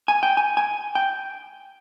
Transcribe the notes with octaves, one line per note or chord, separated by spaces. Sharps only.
G#5
G5
G#5
G#5
G5